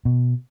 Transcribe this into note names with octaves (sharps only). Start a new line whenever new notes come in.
B2